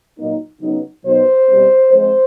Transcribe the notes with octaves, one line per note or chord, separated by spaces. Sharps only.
A#2 F#3 A#3 D#4
C#3 F#3 B3 D#4
B2 F#3 B3 D#4 C5
B2 G3 C4
F3 G#3 C4 C5